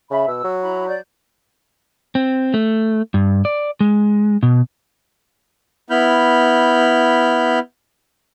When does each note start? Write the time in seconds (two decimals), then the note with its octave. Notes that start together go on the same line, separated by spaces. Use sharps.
0.10 C#3 E5 B5
0.28 B2 E6
0.44 F#3
0.61 E4 A#5 B5
0.87 D5 G6
2.15 C4
2.54 A3
3.14 G2
3.45 D5
3.81 G#3
4.43 B2
5.90 B3 E4 B5 F6 G6